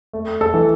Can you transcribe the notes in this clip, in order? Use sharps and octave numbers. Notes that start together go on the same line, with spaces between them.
A3
A4
E3